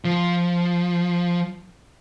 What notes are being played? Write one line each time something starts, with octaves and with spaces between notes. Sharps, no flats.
F3